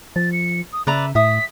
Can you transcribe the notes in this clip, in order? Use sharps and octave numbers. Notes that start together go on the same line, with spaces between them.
F3 A6
C#7
D#6
C#3 B4 D5 E5 A#5
A2 E5 D#6 B6